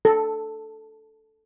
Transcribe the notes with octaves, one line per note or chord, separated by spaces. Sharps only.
A4